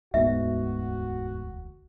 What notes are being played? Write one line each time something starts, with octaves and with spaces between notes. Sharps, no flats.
E1 D2 G#2 B2 F#4 E5